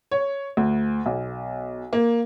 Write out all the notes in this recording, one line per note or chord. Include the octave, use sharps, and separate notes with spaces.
C#5
D2
B1
A#3